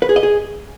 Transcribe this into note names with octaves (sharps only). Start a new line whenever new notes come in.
B4
G#4
D#5
G#4